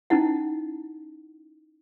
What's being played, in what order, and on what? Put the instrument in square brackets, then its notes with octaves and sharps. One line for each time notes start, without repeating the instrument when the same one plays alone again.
[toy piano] C#4 D#4 E4 F#5